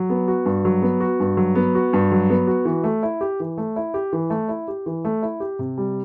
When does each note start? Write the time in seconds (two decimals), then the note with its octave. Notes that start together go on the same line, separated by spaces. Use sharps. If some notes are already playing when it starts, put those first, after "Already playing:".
Already playing: F#3
0.10 B3
0.28 F#4
0.45 G2
0.65 F#3
0.82 B3
1.00 F#4
1.20 G2
1.37 F#3
1.55 B3
1.75 F#4
1.93 G2
2.12 F#3
2.30 B3
2.47 F#4
2.65 E3
2.84 A3
3.03 E4
3.21 G4
3.40 E3
3.58 A3
3.76 E4
3.94 G4
4.13 E3
4.30 A3
4.49 E4
4.68 G4
4.86 E3
5.05 A3
5.22 E4
5.40 G4
5.59 C3
5.78 G3